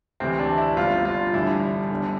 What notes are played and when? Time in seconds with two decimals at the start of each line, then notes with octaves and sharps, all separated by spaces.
0.20 D2 C3 E3 C4
0.40 D4
0.58 E4
0.77 G1 G2 D3 F4
1.05 F4
1.34 A1 G2 D3 E4
1.90 G1 G2 D3